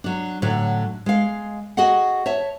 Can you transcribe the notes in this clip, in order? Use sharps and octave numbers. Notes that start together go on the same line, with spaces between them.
F#3 D4
A2 D3 F#3
G#3 F5
F#4 G#4 D#5 F#5
C#5 E5 A5